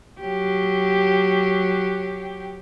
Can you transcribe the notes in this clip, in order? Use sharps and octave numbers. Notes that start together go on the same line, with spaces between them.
F#3 G4